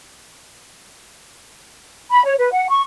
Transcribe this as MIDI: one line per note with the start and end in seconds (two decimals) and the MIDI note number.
2.10 2.23 83
2.25 2.34 73
2.38 2.50 71
2.52 2.68 78
2.69 2.83 85